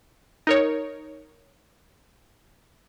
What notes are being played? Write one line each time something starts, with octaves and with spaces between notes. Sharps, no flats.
D#4 A#4 C#5